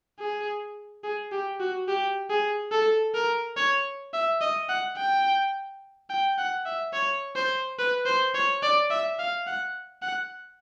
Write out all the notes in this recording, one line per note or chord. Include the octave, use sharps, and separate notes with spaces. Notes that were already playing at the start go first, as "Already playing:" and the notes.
G#4
G#4
G4
F#4
G4
G#4
A4
A#4
C#5
E5
D#5
F#5
G5
G5
F#5
E5
C#5
C5
B4
C5
C#5
D5
E5
F5
F#5
F#5